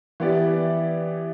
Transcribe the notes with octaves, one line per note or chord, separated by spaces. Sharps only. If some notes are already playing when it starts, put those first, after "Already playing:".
E3 B3 E4 G4 D5